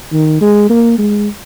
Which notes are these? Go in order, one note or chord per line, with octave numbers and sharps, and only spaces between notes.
D#3
G#3
A#3
G#3